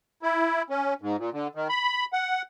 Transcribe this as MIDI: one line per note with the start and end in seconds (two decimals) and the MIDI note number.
0.23 0.62 64
0.70 0.94 61
1.01 1.16 44
1.19 1.30 46
1.33 1.48 50
1.55 1.68 51
1.69 2.05 83
2.13 2.42 78